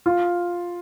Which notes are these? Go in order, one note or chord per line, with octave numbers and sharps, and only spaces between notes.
F4